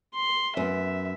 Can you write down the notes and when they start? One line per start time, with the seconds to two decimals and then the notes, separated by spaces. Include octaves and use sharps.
0.14 C6
0.57 F#2 B3 E5